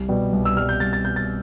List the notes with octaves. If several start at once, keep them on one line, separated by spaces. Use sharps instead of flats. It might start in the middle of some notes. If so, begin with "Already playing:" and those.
Already playing: C2
B2 G3
C2
E6
B2 G3 F6
G6
C2 A6
A6
B2 G3 G6
A6